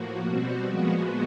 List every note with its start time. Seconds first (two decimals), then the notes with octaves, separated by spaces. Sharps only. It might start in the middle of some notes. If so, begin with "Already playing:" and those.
Already playing: A2 F3 A#3 F#4
0.25 B2 G3 C4 F#4
0.65 A#2 F3 G#3 B3